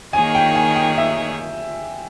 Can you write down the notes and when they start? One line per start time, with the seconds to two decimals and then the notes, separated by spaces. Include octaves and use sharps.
0.13 D#3 A#3 D#4 G#4 C#5 G#5
0.35 G5
0.55 G#5
0.75 G5
0.98 E5